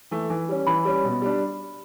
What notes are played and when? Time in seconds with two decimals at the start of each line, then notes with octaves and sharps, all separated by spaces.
0.11 E3 A3
0.30 E3
0.49 G3 C#4
0.67 E3 B5
0.85 G3 C#4
1.04 B2
1.22 G3 D4